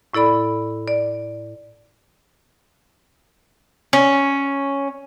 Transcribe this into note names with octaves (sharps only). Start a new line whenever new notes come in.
A2 E4 A4 D5 B5
D5
C#4